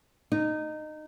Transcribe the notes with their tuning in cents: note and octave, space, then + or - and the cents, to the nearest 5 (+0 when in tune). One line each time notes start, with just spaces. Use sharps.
D#4 -20